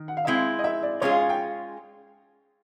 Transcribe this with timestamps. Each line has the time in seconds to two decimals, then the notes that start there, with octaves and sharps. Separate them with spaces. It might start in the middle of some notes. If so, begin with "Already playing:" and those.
Already playing: D#3
0.08 F#5
0.17 F5
0.25 G#3 C4 E4 E5
0.34 F5
0.59 D#5
0.64 E5
0.83 D5
1.01 G#3 C#4 F4 G#4 C#5
1.10 F5
1.20 F5
1.29 G5